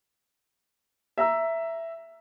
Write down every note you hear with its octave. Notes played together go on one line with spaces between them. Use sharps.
E5 A#5 E6